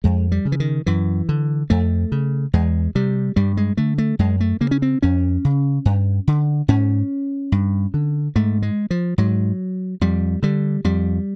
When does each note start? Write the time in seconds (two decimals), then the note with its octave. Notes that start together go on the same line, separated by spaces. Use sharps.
0.04 F2 G#3
0.32 G3
0.45 C#3
0.52 E3
0.60 D#3
0.86 F#2 E3
1.29 D3
1.70 F2 A3
2.12 C#3
2.53 E2 G#3
2.95 C3 G3
3.36 G2 G3
3.57 G#3
3.77 D3 A3
3.98 A3
4.19 F#2 G#3
4.40 A3
4.61 C#3 A#3
4.71 C#4
4.82 C4
5.02 F2 C#4
5.45 C#3
5.85 G2
6.27 D3
6.68 G#2 C#4
7.52 G2
7.94 D3
8.36 G#2 A3
8.62 G#3
8.91 F3
9.18 G#2 F#3
10.01 F2 G3
10.43 D3 G3
10.84 F2 G3